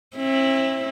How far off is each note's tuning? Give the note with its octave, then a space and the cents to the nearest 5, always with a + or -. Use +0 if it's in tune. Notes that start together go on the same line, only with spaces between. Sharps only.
C4 +40 E4 -5